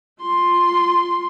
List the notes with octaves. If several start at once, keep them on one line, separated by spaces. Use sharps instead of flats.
F4 C6